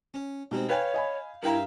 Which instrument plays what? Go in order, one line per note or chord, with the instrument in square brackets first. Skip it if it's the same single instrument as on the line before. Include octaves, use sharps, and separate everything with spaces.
[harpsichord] C#4
[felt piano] B2 D#4 [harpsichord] G3 G#3 C4
[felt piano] B4 G5 G#5 [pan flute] C#5 [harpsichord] F5
[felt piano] D#5 G#5 B5
[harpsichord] G2 E5 F5 [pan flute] E4 [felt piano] A#4 G5 A#5